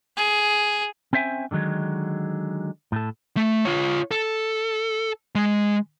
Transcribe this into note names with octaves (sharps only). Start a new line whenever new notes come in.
G#4
C4 C#4 C5 E5 G5 G#5
D3 D#3 F#3 G#3
A2 A4
A3
F4 C#5
A4
G#3